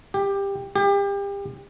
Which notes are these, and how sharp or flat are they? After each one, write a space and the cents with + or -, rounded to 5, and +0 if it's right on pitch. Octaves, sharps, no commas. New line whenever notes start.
G4 +15
G4 +30